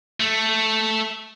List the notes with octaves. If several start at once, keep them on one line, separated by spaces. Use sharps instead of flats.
A3